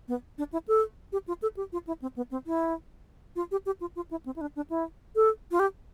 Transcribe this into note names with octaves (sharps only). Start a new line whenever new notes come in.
B3
D4
E4
A4
G4
F4
A4
G4
F4
E4
C4
B3
C4
E4
F4
G4
G4
F4
F4
E4
C4
E4
D4
D4
E4
A4
F4
G4